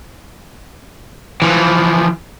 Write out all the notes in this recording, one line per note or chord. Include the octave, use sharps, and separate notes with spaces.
E3 F3